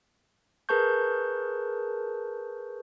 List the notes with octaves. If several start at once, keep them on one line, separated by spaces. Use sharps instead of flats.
G#4 A#4 B4 A5 C#6 G6